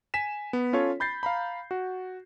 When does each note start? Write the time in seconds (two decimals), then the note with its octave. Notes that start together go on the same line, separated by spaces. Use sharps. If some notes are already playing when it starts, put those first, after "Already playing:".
0.14 G#5 B6 E7
0.53 B3
0.73 C#4 F4 A4 C#5
1.00 B5 G6 A6 C7
1.23 F5 A#5 B5
1.71 F#4